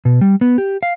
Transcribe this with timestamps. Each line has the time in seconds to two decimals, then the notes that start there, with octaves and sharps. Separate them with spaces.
0.05 B2
0.21 G3
0.41 B3
0.58 G4
0.83 F5